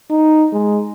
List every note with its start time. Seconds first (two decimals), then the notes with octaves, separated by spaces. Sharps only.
0.10 D#4
0.53 G#3